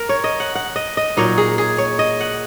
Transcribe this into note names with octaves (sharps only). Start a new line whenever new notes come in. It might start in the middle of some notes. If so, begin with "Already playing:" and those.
Already playing: A#4
C#5
D#5
F#5
F#5
D#5
D#5
A#2 F#3 D#4 C#5
G#4
G#4
C#5
D#5
F#5